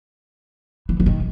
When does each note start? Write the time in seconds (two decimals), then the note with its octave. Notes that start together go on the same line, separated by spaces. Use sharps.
0.89 E3
1.00 E3
1.06 D#3